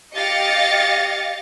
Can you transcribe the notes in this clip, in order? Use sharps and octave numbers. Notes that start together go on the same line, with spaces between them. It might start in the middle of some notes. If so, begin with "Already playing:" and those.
G4 D#5 F5 A6 A#6 C#7